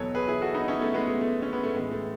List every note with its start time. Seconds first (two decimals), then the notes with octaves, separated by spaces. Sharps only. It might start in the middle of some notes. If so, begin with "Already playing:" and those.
Already playing: E2 B2 F#3 A4 B4 C#5
0.15 G#4 B4
0.28 E4 G#4
0.42 F#4 A4
0.54 B3 D#4
0.68 C#4 E4
0.81 A3
0.94 G#3 B3
1.08 A3
1.21 A3
1.42 C#4
1.53 B3
1.64 A3
1.74 A2 E3 G#3
1.92 A3